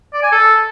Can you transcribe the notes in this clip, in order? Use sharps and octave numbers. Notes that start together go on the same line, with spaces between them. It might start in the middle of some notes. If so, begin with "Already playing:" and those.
D5
G#5
A4